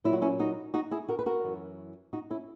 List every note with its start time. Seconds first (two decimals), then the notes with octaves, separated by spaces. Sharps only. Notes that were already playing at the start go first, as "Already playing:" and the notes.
0.04 A#2 F#3 E4
0.13 F#4
0.22 C#4 E4
0.39 D#4 F#4
0.74 D#4 F#4
0.91 E4 G#4
1.08 F#4 A#4
1.19 B4
1.26 F#4 A#4
1.44 F#2 E3
2.13 D#4 F#4
2.30 C#4 E4